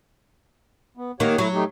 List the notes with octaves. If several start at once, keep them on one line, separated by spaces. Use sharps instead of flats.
B3
D#3 A#3 G4 C#5 F#5
F#3 A3 E4
A3 D#4 G4